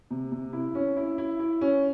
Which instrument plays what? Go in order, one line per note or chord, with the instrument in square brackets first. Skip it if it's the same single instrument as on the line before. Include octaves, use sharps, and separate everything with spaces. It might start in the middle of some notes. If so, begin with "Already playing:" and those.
[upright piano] C3
C3
E4
C#4
E4
E4
E4
C#4